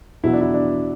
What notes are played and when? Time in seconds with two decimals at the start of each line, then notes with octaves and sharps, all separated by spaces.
0.23 E2 B2 F#3 E4
0.33 D4
0.41 E4
0.54 D4